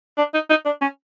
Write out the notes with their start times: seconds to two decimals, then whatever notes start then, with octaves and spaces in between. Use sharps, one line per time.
0.18 D4
0.34 D#4
0.50 D#4
0.65 D4
0.82 C#4